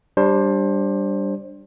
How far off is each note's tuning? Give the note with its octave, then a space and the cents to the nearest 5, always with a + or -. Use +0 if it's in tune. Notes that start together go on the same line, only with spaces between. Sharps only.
G3 +0 D4 +0 C5 +25